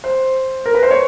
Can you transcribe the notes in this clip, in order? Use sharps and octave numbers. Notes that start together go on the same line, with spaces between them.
C5
A#4
B4
C5
C#5